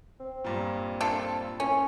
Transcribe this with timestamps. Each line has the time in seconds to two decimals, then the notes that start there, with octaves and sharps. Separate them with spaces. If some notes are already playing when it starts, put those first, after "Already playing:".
0.20 C4
0.45 G2 A#2
1.01 D4 F4 A4
1.60 A2 C#4